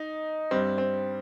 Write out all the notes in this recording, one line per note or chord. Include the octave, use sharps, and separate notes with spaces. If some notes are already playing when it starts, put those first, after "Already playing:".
Already playing: D#4
G2 G3 C4
C4